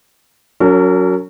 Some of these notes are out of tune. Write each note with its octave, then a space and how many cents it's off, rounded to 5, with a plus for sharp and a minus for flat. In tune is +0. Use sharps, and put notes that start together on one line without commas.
F#3 +0 C#4 +35 A#4 -35